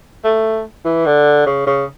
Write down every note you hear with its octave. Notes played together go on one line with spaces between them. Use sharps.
A3
E3
D3
C#3
C#3